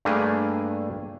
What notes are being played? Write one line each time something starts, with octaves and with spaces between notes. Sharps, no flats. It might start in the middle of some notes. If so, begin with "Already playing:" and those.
G2 A3 A#3 D4 G#4 G#5